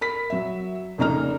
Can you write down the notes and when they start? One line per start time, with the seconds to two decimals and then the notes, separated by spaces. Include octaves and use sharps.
0.01 A#4 B5 B6
0.30 F#3 E5
0.98 F1 C#3 A#3 D#4 A#5 F6